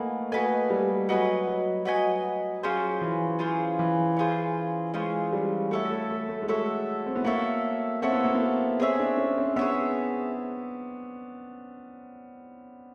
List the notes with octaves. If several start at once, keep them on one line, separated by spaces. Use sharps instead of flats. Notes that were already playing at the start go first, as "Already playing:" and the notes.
Already playing: A3 A#3 F#4 B4 D#5 G#5
A3 F#4 B4 D#5 G#5
G3
F#3 F#4 B4 D#5 G#5
F#3
F#3 F#4 B4 D#5 G#5
F#3 C#4 F4 G#4 C5
E3
C#4 F4 G#4 C5
E3
C#4 F4 G#4 C5
G#3 C#4 F4 G#4 C5
G3
A3 F#4 A4 C#5 E5
A3
A3
A3
G#3
A3 F#4 A4 C#5 E5
C4
B3
A#3 F#4 A4 C#5 E5
C4 F#4 A4 C#5 E5
B3
A#3
B3
C4 G#4 C#5 E5
D4
C#4
C4
B3 G#4 C#5 E5